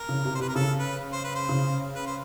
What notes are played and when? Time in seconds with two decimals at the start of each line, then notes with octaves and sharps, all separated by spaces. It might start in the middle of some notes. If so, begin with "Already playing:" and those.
Already playing: A#4
0.09 C#3
0.25 C3
0.35 C5
0.40 C3 B4
0.49 A#4
0.55 C#3 A4
0.79 B4
1.13 C5
1.24 B4
1.35 C5
1.49 C#3
1.95 B4
2.07 C5